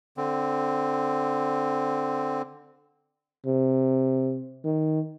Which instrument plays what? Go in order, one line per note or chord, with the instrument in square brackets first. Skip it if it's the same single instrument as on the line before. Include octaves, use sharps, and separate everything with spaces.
[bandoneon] D3 C4
[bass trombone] C3
D#3